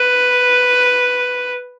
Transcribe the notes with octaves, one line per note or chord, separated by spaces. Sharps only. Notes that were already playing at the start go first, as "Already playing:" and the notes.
Already playing: B4